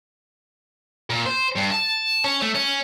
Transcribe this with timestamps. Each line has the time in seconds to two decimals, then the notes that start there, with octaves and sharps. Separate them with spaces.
1.10 A#2
1.26 C5
1.56 G2
1.71 A5
2.24 C#4
2.42 A3
2.55 C#4